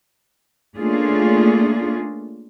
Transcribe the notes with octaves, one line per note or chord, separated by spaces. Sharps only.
A3 A#3 C#4 D4 F4 G#4